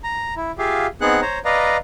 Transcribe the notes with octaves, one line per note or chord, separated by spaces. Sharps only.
A#5
E4
F4 G4 G#4 E5 F5
B3 C4 D#4 G#4 F#5 F#6
C5 C#5 A#5
B4 D5 D#5 F5 A#5